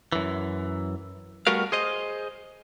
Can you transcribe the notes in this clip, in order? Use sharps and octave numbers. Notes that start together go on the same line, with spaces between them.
F#2 E3
G3 A3 B3 F#4 A#4 F5
G#4 C5 D#5